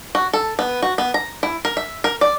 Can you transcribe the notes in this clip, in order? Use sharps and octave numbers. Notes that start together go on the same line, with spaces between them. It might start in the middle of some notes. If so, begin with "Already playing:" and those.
F#4
A4
B3
F#4
B3
A#5
E4
A#4
E5
A#4
D5